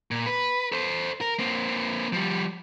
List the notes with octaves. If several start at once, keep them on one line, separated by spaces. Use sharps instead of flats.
A#2
B4
A4 C5
A#4
A#3 C4
F3 G3